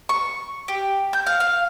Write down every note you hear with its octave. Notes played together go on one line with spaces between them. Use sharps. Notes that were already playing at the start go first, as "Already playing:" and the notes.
C#6
G4
G6
F5
F5